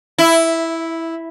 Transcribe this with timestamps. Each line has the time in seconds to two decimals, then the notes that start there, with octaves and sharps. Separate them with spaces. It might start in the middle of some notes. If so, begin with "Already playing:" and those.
0.18 E4